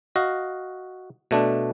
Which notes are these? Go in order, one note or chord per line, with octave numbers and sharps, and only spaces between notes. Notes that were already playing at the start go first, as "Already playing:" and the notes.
F#4 D#5 F5
B2 A3 D4